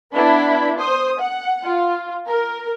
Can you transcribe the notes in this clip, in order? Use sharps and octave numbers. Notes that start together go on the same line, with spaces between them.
B3 D4 E4 B5
C5 D#6
F#5
F4
A#4